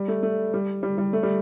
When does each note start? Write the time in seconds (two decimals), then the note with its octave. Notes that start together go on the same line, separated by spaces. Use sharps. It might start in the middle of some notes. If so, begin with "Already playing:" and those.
Already playing: G3
0.08 A3
0.23 A3
0.54 G3
0.83 G3
0.98 G3
1.13 A3
1.23 G3